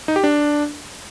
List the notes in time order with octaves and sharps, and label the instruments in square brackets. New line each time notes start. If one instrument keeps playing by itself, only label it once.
[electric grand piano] D#4
G4
D4